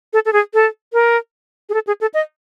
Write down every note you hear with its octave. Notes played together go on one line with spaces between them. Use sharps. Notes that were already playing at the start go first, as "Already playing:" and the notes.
A4
A4
G#4
A4
A#4
G#4
A4
G#4
A4
D#5